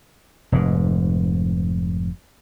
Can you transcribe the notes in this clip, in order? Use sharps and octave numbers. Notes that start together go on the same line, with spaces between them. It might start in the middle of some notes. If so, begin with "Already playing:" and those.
F1 G#2